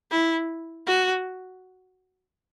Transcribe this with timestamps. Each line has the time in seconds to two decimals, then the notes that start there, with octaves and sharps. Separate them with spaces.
0.11 E4
0.87 F#4